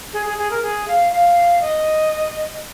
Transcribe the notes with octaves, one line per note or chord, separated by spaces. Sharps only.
G#4
G#4
G#4
A#4
G#4
F5
F5
D#5